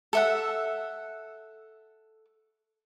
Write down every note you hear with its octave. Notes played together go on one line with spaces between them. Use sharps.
A4 E5 F#5